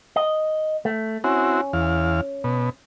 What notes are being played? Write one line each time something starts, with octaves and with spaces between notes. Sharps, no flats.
D#5
A3
C4 C#4 E4 F#4
E2 F5
B2